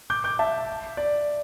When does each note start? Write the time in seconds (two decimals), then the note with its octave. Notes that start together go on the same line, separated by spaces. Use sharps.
0.10 D6 G6
0.24 D6 G6
0.39 E5 A5
0.97 D5